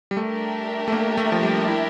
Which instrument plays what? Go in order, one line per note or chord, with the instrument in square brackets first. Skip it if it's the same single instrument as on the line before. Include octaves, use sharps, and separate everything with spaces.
[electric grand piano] G3
[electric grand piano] A3 [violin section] D4 G4 A#4 E5
[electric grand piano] A3
A#3
A3
F3
G3
E4